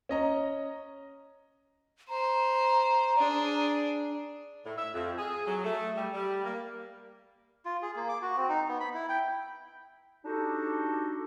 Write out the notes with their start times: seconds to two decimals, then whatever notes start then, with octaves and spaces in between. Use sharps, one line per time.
0.09 C#4 D#5 A#5
2.09 C5 A#5
3.17 D4 G#4
4.64 A2
4.76 E5
4.94 F2
5.17 G#4
5.46 F#3
5.64 A3
5.95 G3
6.14 G3
6.43 A#3
7.65 F4
7.82 G#4
7.96 A#3
8.09 D6
8.22 F#4
8.37 C4
8.49 D#4
8.68 B3
8.81 B5
8.95 E4
9.09 G5
10.25 D4 D#4 F#4 G4 A4